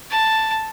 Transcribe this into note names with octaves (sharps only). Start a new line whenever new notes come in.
A5